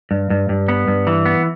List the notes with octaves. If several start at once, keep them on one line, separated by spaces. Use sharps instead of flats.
G2
G2
G2
B3
G2
E3
B3